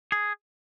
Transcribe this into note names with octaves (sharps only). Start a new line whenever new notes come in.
G#4